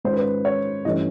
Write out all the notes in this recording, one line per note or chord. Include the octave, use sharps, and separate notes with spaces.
G#2 D#3 G#3 C#4 F4 C5
B4
C5
C#5
G2 E3 A3 C#4 D#5